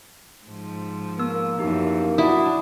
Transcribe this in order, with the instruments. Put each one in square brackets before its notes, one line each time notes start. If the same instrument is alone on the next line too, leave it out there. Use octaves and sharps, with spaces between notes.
[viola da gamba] G#2 F3
[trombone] A#3 [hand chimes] B3 E6
[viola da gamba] F#2 E3 F3 [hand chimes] D#4 G4
[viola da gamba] D4 [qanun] E4 [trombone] F#4 [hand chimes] D#6